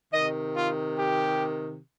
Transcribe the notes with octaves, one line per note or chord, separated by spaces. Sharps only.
C3 D#3 D#5
F4
G4